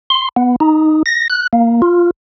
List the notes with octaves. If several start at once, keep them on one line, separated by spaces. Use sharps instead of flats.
C6
B3
D#4
A#6
F#6
A#3
F4